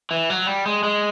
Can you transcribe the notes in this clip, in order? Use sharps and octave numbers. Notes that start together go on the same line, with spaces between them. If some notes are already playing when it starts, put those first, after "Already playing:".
E3
F#3
G3
G#3
G#3